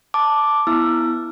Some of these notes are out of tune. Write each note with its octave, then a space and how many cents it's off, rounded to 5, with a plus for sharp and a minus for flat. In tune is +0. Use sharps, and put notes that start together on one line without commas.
A5 +0 D6 +0
B3 +0 E4 +0 E6 +30